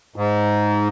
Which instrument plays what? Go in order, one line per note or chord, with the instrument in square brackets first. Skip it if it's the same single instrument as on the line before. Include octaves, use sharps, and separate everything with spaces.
[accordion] G#2